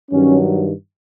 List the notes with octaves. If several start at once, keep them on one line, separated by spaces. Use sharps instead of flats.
G2 D#3 F#3 C#4